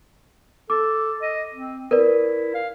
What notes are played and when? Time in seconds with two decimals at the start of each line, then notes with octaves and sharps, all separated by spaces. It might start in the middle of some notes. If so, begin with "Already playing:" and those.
0.70 A4 D6
1.22 D#5
1.54 C4
1.91 E4 A#4 B4 D5
2.54 F5